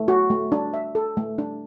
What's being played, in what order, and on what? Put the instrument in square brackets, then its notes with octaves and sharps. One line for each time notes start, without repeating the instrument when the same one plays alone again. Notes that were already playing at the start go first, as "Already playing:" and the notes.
Already playing: [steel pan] A3
F#4
A3
D4
E5
A4
A3
D4